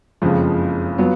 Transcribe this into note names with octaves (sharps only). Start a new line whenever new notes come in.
F#1 F2 C#3 F3 G#3
F#3 B3 F4